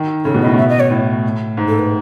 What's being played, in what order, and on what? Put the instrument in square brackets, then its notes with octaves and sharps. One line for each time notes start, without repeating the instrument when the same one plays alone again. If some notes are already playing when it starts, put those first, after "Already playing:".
Already playing: [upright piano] D#3
[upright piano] C#3 [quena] A4
[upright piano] B2
[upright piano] A2 [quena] D#5
[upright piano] B2 [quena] E5
[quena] D#5
C#5
[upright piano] A2
G#2
[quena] A4
B4